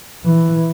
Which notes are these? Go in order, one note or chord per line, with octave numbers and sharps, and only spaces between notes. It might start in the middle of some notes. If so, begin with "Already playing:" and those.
E3